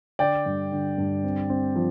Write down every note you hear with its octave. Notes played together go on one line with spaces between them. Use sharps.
D3 D5 G5
G2
D3
G2
C4
C4
F3